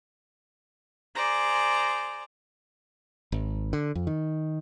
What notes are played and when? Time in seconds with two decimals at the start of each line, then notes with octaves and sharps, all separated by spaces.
1.16 G#4 C5 D5 A#5
3.32 G#1
3.73 D3
3.95 F2
4.07 D#3